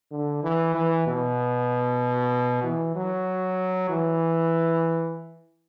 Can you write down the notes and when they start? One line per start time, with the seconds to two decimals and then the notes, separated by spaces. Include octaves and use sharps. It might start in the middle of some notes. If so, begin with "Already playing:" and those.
0.12 D3
0.43 E3
0.75 E3
1.07 B2
2.64 E3
2.96 F#3
3.89 E3